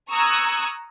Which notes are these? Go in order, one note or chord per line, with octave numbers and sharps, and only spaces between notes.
A#5 C#6 D#6 E6 F#6 G#6